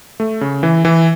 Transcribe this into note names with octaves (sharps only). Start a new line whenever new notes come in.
A3
C#3
E3
E3